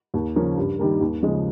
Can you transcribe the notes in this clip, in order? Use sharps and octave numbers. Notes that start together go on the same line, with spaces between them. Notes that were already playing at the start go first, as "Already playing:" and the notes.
D#2
C#3 F3 A#3 C#4
G2
D#3 G3 A#3
D#2
C#3 F3 G#3